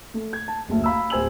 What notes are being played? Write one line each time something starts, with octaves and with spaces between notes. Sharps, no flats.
A3
G#6
A5
F#1 D2
F5 B5 E6
D1 C5 G#5 E6 F#7